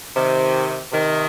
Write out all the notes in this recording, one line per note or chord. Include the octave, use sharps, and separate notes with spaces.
C3 D#3
C3 D#3